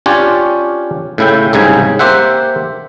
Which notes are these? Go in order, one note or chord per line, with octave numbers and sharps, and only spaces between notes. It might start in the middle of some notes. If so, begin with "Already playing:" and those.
C#4 D4 F4 G4 C#5 D5
A2 C#3 E4 E5 G5
C2 G#2 C#3 G#5
A#3 G4 C5 E5 F#5